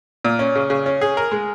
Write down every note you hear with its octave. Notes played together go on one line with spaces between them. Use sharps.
A#2
C#4
C#3
C#3
C#4
G#4
A#4
G#3